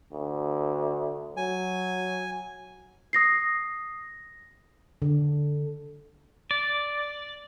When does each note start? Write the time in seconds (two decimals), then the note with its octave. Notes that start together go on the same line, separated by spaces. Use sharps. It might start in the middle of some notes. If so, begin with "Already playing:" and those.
0.12 D2
1.37 F#3 G#5
3.13 D#6 A#6 C7
5.02 D3
6.51 D5